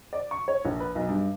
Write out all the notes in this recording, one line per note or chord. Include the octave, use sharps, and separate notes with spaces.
D5
C#6
C#5
A#1
B4
B1
G2